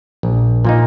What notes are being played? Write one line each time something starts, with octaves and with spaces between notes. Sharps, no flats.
A#1
A#2 A#3 D#4